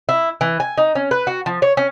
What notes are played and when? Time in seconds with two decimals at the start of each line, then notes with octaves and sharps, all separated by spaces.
0.09 E4
0.41 E3
0.60 G#5
0.77 D#4
0.95 C#4
1.11 B4
1.27 F#4
1.46 F3
1.62 C#5
1.77 C#4